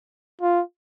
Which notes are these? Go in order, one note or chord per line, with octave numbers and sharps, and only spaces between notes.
F4